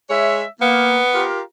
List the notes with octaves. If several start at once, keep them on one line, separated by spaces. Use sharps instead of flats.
G#3 C#5 E5
A#3 B3
F4 G4 A#4